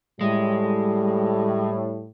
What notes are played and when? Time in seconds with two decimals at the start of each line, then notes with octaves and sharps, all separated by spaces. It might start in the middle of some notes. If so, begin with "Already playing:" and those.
0.21 A2 G3 G#3